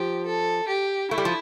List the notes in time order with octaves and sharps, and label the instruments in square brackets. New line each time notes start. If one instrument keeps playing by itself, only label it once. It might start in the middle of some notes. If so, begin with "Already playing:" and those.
Already playing: [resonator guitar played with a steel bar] F3 [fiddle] G4
[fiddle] A4
G4
[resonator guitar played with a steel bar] A3 [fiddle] E4
[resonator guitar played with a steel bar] G3
F3